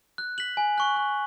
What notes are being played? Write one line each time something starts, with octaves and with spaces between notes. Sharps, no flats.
F#6
B6 F#7
G#5
C#6 F#6
C#6